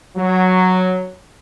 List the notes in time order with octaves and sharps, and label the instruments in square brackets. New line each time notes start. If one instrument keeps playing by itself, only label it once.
[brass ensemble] F#3